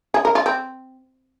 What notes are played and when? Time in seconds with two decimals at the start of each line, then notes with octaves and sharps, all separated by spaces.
0.14 G#4
0.25 A#4
0.35 F4
0.46 C4